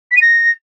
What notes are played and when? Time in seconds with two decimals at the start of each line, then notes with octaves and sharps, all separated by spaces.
0.11 B6
0.16 D#7
0.21 A#6